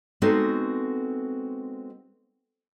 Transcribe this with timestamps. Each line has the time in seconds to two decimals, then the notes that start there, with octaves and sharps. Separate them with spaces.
0.22 G#3 B3 C4 D#4 F#4 A4